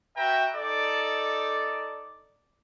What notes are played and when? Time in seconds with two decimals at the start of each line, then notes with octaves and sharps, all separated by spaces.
0.16 F#4 B4 E5 G5 A#5
0.55 D#4 A4 D5